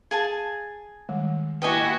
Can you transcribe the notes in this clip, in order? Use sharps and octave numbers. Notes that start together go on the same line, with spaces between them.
G#4 F5 G#5 A5
D#3 G3 G#3
A#3 E4 F#4 G4 B4 D#5 G#5